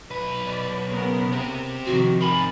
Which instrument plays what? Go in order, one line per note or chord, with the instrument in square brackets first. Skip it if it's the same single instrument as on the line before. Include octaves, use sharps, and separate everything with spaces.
[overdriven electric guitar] B1 B4
[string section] D5
C#3 B3 A#4
[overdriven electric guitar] C4 G4
[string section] C3 D#3 F3 [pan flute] F#4
[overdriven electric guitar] A#4 G#5 [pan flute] B5